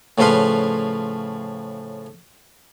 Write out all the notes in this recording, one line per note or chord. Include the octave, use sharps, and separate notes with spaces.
A2 C#3 F3 B4 F5 C6